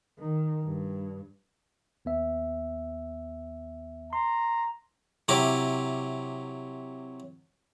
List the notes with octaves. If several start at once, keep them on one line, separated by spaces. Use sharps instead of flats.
D#3
G2
D#2 B3 E5
A#5 C6
C3 F#3 E4 G4 A#5 D6